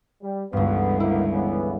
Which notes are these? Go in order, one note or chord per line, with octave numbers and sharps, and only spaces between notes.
G3
G1 C#2 G2 E3 B3
A#3 B3 D#4 E4
C#3 E3 B3